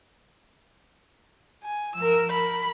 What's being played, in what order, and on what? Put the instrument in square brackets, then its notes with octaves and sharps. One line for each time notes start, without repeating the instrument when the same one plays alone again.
[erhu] G#5
[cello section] F3 A#4 [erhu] E6
[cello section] A#4 [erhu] B5